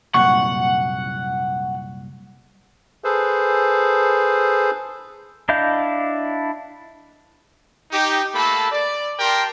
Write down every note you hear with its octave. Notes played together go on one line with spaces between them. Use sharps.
C2 F#2 A#2 F#5 C#6
G#4 A4 B4 C5
D4 E4 D#5 F5 G6
D#4 G4
A3 A#3 A4 A5 B5
D5
G4 A#4 G5 A5 C6